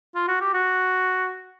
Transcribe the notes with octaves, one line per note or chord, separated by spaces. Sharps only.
F4
F#4
G4
F#4